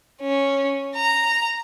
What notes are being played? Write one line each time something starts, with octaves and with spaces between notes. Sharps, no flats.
C#4
A#5